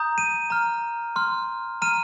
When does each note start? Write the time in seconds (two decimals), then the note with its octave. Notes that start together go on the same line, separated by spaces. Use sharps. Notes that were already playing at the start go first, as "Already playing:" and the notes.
Already playing: A#5 D#6 G6
0.18 D#7
0.50 A#5 F6
1.16 C6 F6
1.82 A#5 F6 D#7